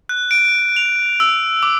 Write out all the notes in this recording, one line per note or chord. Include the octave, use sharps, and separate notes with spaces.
F#6
D7
F7
E6
D6